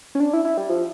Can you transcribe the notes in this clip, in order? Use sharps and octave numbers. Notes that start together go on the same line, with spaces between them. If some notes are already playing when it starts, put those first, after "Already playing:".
C#4
D4
E4
E4
G3
F3